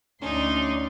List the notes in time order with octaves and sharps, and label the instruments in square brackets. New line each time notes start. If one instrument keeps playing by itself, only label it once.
[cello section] D2 D5 [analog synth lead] C#4 [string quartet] D#4 [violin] C6